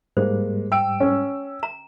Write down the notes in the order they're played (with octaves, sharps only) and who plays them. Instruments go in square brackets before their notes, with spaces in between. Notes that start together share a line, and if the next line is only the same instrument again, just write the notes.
[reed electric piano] G#2 G3 [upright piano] G#3 A#3 [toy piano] C5
[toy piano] G5 [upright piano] E6 D7
[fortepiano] C#4
[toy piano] A#5